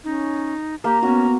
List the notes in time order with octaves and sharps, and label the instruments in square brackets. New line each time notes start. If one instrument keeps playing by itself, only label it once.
[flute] C#4 [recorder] D#4
[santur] A#3 [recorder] G4 [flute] A#5
[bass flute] B3 [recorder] C#4 [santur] F#4